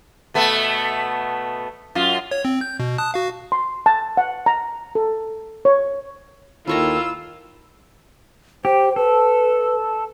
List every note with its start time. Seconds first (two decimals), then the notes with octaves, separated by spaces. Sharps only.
0.34 B2 A3 B3
1.95 F#2 F4
2.31 C#5
2.45 C4
2.61 G6
2.80 B2
2.98 A5 D#6 F#6
3.14 F#4 F5
3.52 C6
3.86 A5
4.17 F#5
4.46 A#5
4.95 A4
5.65 C#5
6.67 D#2 D#3 E4 F4 A4 C#5 A#5 E6
8.65 G4 C5
8.96 A4 B4